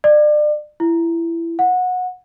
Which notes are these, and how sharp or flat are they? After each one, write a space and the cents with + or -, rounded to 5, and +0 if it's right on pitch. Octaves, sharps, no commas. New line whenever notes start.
D5 +30
E4 +20
F#5 -20